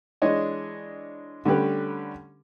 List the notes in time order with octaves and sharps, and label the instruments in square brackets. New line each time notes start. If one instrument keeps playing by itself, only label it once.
[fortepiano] E3 G#3 D4 C#5 D#5
D3 G3 A3 C#4 G4 B4